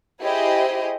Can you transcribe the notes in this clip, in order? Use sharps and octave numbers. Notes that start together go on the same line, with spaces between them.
E4 G4 G#4 C5 D#5